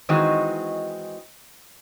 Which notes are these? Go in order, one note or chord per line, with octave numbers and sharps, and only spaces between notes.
D#3 E3 G#3 C4 D#4 F#4